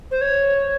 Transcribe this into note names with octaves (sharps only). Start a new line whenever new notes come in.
C5
C#5